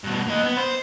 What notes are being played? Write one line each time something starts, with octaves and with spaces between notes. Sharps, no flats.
G2 B2
A#3 D#5
B3
C5